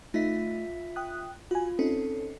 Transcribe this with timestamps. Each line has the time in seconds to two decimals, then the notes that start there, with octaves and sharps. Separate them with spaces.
0.14 A3 D#4 F4 E5 B6
0.96 G5 D#6 F#6
1.51 F4 F#4 G#5
1.79 C4 C#4 D#4 A4